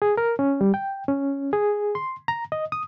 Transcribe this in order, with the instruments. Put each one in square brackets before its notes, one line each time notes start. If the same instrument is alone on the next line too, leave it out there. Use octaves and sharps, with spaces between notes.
[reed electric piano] G#4
A#4
C#4
G3
G5
C#4
G#4
C6
A#5
D#5
D#6